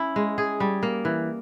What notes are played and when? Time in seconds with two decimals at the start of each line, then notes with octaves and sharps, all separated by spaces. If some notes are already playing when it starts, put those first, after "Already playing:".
Already playing: C#4 E4
0.16 G#3
0.38 G#4
0.60 G3
0.83 A#3
1.05 E3